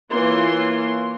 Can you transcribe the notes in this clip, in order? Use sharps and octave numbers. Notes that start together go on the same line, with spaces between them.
E3 A#3 F4 C#5 C6